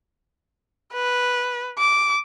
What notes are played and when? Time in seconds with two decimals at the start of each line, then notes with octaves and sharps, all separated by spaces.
0.93 B4
1.79 D6